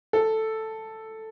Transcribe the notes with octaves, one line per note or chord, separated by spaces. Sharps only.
A4